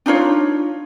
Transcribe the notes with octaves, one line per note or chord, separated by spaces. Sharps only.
D4 D#4 F4 C#5